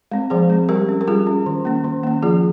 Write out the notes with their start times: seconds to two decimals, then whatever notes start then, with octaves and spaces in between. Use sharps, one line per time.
0.12 G#3 C4
0.30 F3 G#4 C5
0.50 G#3 C4
0.69 G3 G4 A#4
0.89 C#4
1.01 A#4
1.08 G3 F4 G#4
1.27 C#4
1.46 D#3
1.65 A#3 C#4
1.84 D#3
2.03 A#3 C#4
2.23 F3 F4 G#4